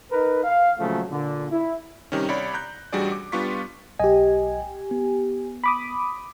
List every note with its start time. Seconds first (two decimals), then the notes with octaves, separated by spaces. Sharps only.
0.11 D#4 A#4 B4
0.44 F5
0.79 A#2 C#3 F3 F#3 A3
1.11 A#2 D3
1.51 E4
2.12 C3 D#3 G3 C#4
2.28 C2 C#5 D5 B5
2.54 A#5 F#6 G6
2.93 A1 G3 D4 F#4 G#4 D5
3.12 D6
3.32 G3 B3 D4 F4 C#6 B6
3.99 B1 G4 D#5 G#5
4.91 B3
5.64 B5 D6 D#6